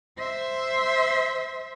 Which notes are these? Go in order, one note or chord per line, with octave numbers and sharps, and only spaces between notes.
C5 E5